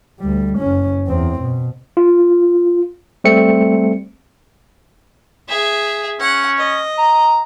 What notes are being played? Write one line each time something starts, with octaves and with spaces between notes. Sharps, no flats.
D2 G3
F#1 C#4
E2 C4
B2
F4
G3 A3 C4 C#7
G#4 E5
C#4 F#5
D#5
A#5